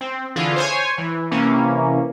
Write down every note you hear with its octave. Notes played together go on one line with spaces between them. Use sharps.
C4
D3 E3 F4 G#4
C5 C#5 G#5
E3
C3 E3 A#3 C#4